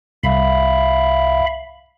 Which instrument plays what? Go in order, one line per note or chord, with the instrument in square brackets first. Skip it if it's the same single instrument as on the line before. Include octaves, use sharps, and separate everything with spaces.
[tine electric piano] C2 [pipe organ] E5 F5 B5